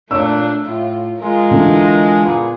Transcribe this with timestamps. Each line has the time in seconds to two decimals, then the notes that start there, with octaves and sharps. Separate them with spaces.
0.11 A#2 A3 D4 C#5 E6
0.65 A2 F4
1.20 G#3 F4 A#4
1.51 D3 E3
2.25 A#2 A#3 B3 G#4